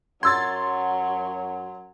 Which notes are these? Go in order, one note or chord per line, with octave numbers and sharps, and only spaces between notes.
F#2 F#3 C6 E6 G#6 A6